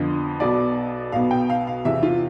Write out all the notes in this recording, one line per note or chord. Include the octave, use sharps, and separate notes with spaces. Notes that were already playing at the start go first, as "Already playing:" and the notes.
Already playing: F2 D3 F3 B3
B1 B2 B3 D5
B1 B2 B3 F5
G5
F5
F5
E2 C3 E3 E5
F4